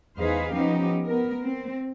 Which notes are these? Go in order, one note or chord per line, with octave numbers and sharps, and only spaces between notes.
E2 D#4 G#4 B4 C5 F5
F3 B3 C#4 D#4 G4
B3 A#4
C4